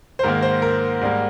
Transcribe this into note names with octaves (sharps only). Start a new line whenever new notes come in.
C5
G#2 D#3 A#3 A#4
C5
A#4
G#2 G3 A#3